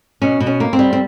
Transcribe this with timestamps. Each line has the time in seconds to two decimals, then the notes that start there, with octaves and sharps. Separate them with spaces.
0.22 B2 C#4
0.40 B2
0.47 C#4
0.60 A#3
0.73 C4
0.79 G3
0.93 C4